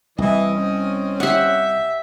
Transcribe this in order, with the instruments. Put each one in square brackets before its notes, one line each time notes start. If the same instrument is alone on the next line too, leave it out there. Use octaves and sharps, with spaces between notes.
[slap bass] C2 [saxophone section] E3 [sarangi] D#5
[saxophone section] C4 C#4
[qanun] G4 F#5 [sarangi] E5